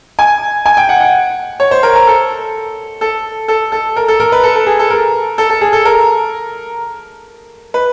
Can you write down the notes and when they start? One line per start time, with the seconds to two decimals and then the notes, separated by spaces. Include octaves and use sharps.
0.19 G#5
0.66 G#5
0.77 G5
0.89 F#5
1.00 F#5
1.60 C#5
1.71 C5
1.83 A#4
1.95 A#4
2.07 A4
3.01 A4
3.48 A4
3.72 A4
3.96 A#4
4.08 A4
4.20 A#4
4.32 B4
4.43 A4
4.56 A4
4.67 G#4
4.79 A4
4.90 A#4
5.38 A4
5.50 A4
5.61 G#4
5.73 A4
5.85 A#4
7.74 B4